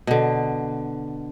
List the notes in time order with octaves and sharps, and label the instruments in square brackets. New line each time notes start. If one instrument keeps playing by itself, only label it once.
[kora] B2 D3